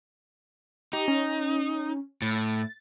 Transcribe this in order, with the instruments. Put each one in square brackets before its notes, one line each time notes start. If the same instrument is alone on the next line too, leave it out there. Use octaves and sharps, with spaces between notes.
[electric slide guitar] D#4 [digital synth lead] G4
[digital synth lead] C#4
[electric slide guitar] A2 [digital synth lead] A6